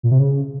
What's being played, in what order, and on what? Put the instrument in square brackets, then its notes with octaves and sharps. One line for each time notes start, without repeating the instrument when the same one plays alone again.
[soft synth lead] A#2
C3
C#3